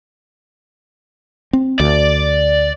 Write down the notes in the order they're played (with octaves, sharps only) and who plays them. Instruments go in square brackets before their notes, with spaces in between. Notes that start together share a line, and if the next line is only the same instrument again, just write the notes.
[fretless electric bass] C4
[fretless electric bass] D2 [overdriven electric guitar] D5